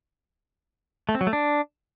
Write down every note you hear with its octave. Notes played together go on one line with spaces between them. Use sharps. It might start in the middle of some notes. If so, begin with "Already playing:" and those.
A3
C4
F#3
A3
D4